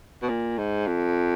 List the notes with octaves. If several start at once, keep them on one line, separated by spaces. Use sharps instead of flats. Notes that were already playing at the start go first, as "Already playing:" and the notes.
B2
A#2
G#2
F2